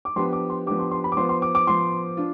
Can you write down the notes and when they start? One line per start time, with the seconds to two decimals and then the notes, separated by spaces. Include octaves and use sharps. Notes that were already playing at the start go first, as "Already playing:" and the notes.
0.05 D6
0.16 F3 B3 D4 G4 C6
0.33 D6
0.50 C6
0.66 F3 B3 D4 G4 D6
0.79 C6
0.91 C6
1.04 B5
1.12 D6
1.17 F3 B3 F4 C5 C6
1.29 C6
1.42 D6
1.55 D6
1.67 F3 B3 F4 C5 C6
2.17 D4 F4